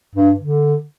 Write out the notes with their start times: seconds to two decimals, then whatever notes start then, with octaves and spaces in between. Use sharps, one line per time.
0.15 G2
0.40 D3